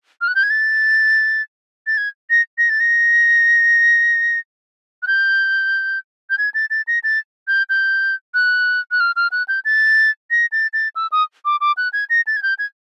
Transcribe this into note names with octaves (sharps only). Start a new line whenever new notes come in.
F6
F#6
G6
G#6
A6
A6
G#6
A#6
A#6
A6
A#6
F#6
G6
G6
G#6
A6
A6
A#6
A6
G6
G6
F#6
F#6
F6
F6
F#6
G6
A6
A#6
A6
A6
E6
D#6
D6
D6
F#6
G#6
A#6
A6
G#6
G6
G#6